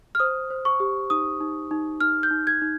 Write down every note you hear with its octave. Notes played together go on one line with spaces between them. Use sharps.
F6
C5 D#6
C5
C#6
G4
D#4 D#6
D#4
D#4
D#4 F6
G6
D#4
G#6
D#4